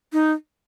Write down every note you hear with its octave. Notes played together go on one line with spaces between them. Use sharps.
D#4